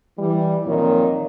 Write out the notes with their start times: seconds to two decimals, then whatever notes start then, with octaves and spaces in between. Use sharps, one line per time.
0.19 E3 G3
0.65 F2 A#2 D#3 C#5